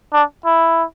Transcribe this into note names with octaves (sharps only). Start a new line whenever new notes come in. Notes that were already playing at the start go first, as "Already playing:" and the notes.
D4
E4